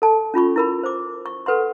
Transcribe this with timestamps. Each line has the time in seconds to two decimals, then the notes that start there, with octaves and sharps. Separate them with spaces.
0.02 A4 A5
0.34 C#4 F4 B5 C#6
0.56 E4 A#4 B5
0.84 C5 D6
1.26 C#6
1.46 A4 B4 F#5 C6